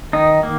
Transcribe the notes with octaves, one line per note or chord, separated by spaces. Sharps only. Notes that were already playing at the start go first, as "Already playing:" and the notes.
D#3 D#4
A#3